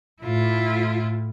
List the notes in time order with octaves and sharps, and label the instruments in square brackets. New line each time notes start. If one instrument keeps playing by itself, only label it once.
[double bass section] A2 [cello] E4 F4